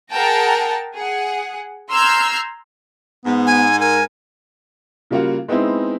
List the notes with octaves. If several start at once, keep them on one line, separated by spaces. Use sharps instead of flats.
G#4 A#4 F#5 G5 A5 A#5
G#4 F#5
A#5 C6 E6 F6 G6 G#6
G#2 B3
G#5
A#4 G#5
C#3 G3 A#3 F4 F#4
G#3 B3 C4 D#4 E4